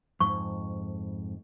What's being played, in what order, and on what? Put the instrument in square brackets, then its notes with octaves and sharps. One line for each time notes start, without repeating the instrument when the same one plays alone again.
[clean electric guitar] F2 G#2 [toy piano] C#6